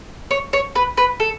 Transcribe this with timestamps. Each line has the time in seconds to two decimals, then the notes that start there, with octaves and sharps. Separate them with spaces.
0.31 C#5
0.53 C#5
0.75 B4
0.97 B4
1.20 A4